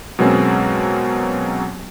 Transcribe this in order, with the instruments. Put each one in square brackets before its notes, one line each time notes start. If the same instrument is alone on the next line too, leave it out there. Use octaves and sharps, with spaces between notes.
[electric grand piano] B2 F#3 G#3 A#3 C4 C#4